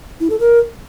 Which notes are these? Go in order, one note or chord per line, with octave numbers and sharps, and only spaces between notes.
E4
A4
A#4